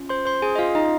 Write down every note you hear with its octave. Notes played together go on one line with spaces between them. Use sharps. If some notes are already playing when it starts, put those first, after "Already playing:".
Already playing: C#4 F4
C5 C6
C5 C6
G#4 G#5
D#5
F4 F5
D#4 D#5